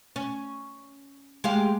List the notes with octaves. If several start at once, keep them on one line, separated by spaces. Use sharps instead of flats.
C#4
G#3 G4 F5